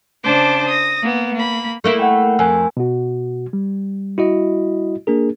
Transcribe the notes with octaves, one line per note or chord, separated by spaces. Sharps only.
C#3 D4 C5 A5 D6
D#6 A#6
A#3 B3
A#3 B5
A3 A#3 E4
F#5 G5
F2 A#4 G#5 E6
B2 F#4
G3
E4 F#4 D#5
A#3 D4 G#4 A#4